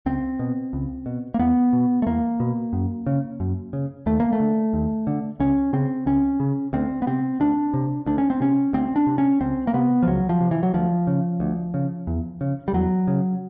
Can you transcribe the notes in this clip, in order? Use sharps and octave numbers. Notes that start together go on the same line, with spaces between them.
C#2 C4
B2
C#2
B2
A#3
E2 B3
B2
A3
E2 A#3
B2
F#2
C#3
F#2
C#3
D#2 A3
A#3
A3
D3
D#2
D3
C#2 C#4
C#3 C4
C#2 C#4
C#3
D2 C4
B3
C3 C4
D2 D4
C3
D2 D4
C#4
C4
C3 C#4
D2 C4
D4
C3
C#4
C#2 C4
A#3
C3 B3
F3
C#2 F#3
F3
C3
E3
F#3
D2 F3
C#3
D2
C#3
E2
C#3
G3
E2 F#3
C#3